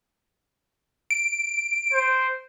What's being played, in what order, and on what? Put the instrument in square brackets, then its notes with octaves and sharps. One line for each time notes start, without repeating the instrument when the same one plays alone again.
[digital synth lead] D7
[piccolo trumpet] C5